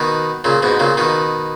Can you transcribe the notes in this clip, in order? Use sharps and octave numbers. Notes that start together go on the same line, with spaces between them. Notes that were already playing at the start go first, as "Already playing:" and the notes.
Already playing: B2 D#3
A#2 C#3
G#2 B2
A#2 C#3
B2 D#3